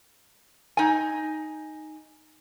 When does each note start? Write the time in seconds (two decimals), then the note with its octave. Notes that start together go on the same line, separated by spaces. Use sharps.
0.77 D#4 G#5